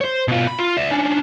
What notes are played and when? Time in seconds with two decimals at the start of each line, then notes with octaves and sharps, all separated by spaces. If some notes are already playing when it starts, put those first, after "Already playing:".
0.01 C5 C#5
0.28 B2 F4
0.47 B5
0.59 F4
0.77 D5 E5
0.91 C#4 D4